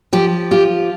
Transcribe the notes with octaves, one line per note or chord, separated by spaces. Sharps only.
F3 G4
F4 G4